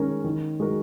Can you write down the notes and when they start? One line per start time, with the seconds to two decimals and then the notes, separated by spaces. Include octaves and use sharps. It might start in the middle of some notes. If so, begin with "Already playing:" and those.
Already playing: D#3 G#3 C#4 A#4
0.24 D#3
0.60 G#3 F#4 A#4